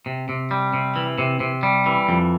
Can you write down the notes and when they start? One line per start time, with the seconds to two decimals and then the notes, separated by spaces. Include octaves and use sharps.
0.06 C3
0.29 C3
0.51 G3
0.74 C3
0.96 E3
1.18 C3
1.40 C3
1.63 G3
1.86 E3
2.09 F2